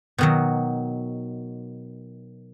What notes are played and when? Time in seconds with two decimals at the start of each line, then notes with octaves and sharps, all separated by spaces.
0.18 B2 D#3 F#3